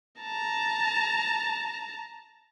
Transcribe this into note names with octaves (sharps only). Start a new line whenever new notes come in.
A5 A#5